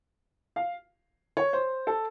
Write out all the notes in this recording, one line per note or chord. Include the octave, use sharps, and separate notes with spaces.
F5
C#5
C5
A4